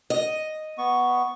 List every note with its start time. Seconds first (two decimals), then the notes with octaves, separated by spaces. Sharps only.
0.10 D#5
0.78 B3 C#6